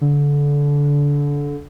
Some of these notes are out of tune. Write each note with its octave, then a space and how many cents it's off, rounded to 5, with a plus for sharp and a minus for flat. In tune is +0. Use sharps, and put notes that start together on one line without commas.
D3 -25